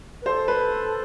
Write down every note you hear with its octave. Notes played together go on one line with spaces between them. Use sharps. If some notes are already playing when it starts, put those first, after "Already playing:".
B4
A4 C5
B4